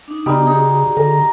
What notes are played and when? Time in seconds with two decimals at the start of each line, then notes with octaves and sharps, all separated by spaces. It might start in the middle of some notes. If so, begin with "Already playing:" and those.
0.08 D4 D#4
0.26 C#3 G3 B3 D4 D#4 F#4 B5
0.47 D#4 F#4 G#4
0.97 D3 A#5